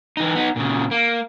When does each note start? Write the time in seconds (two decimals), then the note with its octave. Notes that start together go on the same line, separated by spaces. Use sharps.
0.17 E3 D#4
0.35 B3 D#4
0.56 A#2 C#3
0.91 A#3